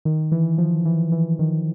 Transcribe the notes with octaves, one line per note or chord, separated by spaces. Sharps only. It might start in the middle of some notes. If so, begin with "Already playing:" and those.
D#3
E3
F3
E3
E3
D#3